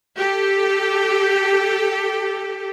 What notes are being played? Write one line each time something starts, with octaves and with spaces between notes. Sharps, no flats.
G4 A4